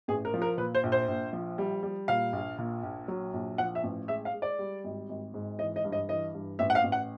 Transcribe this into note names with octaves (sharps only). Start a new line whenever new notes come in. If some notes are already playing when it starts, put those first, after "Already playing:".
A1 G#4
A#4
F3
A#4
A#2 B4
C5
A#1
C5
A#1
F3
G3
G3
A#2 F5
A#1
A#2
A#1
F#3
A#1
F3 F#5
E5
A1
G#3 E5
F5
G#3
D5
G3
G#1
G#1
G#2
E3 D#5
D#5
G2
D#5
E3 D#5
G2
A1 E5
F#5
F5
A1
F#5